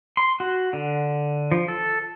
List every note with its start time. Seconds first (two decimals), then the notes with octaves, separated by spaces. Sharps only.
0.17 C6
0.40 F#4
0.73 D3
1.52 F3
1.68 A4